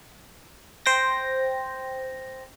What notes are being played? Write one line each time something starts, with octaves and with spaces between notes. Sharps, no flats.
C5 G5 A#6